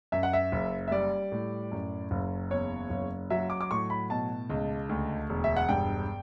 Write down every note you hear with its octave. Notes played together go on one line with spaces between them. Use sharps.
F#2 E5
F#5
E5
F#1
E5
G3 D5
A2
F#2
F#1
E2 C#5
F#1
F#3 E5
D6
D6
A2 C#6
B5
B2 A5
C#2
D2
E1
E5
F#5
G2 G5